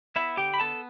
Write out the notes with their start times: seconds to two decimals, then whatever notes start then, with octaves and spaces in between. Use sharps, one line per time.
0.16 B3 E4 E5
0.37 D3 G4 G5
0.54 B5
0.60 B3 A4 A5